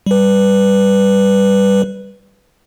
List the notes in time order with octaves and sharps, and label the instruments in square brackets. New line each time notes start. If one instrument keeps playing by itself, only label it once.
[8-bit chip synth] G3 B4